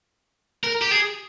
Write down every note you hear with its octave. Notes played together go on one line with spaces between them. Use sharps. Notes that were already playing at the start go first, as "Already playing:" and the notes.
A#4
G4
G#4